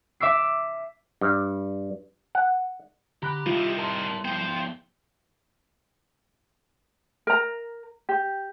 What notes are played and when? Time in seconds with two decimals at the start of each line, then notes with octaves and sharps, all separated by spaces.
0.20 E5 D6 E6 C7
1.21 G2
2.35 F#5
3.23 D3 G4 A#5 B5 F#6
3.46 C3 D#3 G3 E4 F4 E5
3.78 A#4 A5 A#5 C6
4.25 F3 B3 F4 C5 G5
7.27 A#4 A#5
8.09 G4